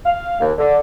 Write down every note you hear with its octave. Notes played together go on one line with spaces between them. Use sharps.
F5
D#2
D3